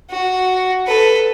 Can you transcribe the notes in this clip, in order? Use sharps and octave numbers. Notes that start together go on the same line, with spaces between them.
F#4
A4 B4